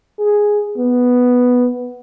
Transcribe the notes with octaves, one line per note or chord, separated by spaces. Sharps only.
G#4
B3